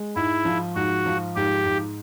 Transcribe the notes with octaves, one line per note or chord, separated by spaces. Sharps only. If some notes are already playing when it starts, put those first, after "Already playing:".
Already playing: G#3
G#2 E4
F3
G#2 F#4
F3
G#2 G4
G#2